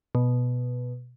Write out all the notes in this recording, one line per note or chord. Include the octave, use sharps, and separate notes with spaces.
B2